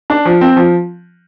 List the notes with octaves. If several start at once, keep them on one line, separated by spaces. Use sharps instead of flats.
D4
F3
C4
F3